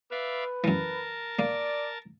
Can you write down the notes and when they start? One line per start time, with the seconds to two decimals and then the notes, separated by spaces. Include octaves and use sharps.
0.11 B4 D5 E5 F5
0.64 F#2 E3 A#4 A5
1.39 A#3 D5